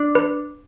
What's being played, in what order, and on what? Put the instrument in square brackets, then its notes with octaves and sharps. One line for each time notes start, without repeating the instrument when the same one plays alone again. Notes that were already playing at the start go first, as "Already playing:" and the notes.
Already playing: [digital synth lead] D4
[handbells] B4